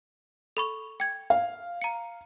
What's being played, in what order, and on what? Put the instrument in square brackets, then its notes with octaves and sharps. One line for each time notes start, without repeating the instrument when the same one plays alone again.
[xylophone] A4 B5 C#6
G5 G#6
[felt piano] F5
[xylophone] A#5 C#7